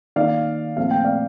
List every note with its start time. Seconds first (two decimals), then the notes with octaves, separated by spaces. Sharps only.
0.16 D#3 A#3 D#4 D5 F5
0.77 A#2 F3 A3 C4 F5
0.91 G5
1.04 D5 F5